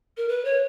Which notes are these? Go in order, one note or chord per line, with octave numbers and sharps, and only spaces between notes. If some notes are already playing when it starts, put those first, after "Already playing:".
A#4
B4
C#5